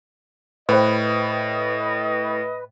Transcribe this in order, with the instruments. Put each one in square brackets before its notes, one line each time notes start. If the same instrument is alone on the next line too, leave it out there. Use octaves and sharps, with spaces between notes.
[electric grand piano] A2 [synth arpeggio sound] B4 [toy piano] C5 G5 B5 [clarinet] D#5